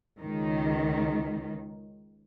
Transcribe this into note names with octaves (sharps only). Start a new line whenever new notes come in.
C#2 D#3